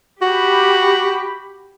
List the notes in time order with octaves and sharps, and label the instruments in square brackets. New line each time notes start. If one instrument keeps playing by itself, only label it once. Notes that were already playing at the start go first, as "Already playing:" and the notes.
[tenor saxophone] F#4 [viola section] G4 B5